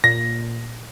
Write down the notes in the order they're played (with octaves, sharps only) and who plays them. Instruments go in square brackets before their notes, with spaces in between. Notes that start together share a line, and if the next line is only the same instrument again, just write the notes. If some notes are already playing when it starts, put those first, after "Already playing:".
[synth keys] A#2 [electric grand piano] A#6